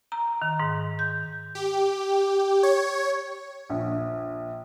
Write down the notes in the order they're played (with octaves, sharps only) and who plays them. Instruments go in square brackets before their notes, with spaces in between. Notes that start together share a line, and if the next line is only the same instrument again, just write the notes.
[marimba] A#5
D#3
G#2
G6
[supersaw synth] G4
C#5
[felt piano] A#1